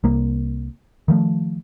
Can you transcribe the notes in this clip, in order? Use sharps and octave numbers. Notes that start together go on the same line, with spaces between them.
C2 A#3
D#3 F3 A3